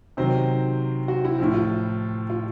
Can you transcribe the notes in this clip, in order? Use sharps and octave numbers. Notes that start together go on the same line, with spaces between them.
C3 D#3 F#3 C5
F#4
E4
A2 F3
F4
F4